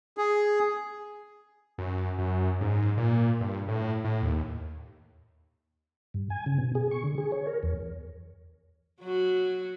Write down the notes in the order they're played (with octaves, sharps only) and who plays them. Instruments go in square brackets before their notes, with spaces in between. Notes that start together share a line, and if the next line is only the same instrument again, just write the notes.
[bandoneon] G#4
[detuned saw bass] F#2
F#2
G#2
A#2
G2
A2
A2
D#2
[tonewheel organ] G2
G#5
C#3
B2
G#4
C#6
D3
G#4
C#5
A#4
E2
[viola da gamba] F#3 F#4